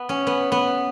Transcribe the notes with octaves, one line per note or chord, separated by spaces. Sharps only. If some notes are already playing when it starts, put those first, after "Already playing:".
Already playing: B3
C#4
B3
B3